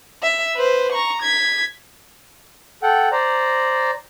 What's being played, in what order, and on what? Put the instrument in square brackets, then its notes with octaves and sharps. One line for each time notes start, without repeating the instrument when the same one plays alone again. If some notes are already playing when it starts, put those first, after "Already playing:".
[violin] E5
B4 C5
A#5 C#6
G#6 B6
[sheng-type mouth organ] A4 F#5 G5
C5 D5 A#5